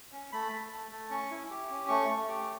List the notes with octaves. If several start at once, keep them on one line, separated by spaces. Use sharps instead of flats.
C#4
A3 B5
A3
A3
A3
C#4 C#6
E4
G4
C#4
A3 C#6
A3
G4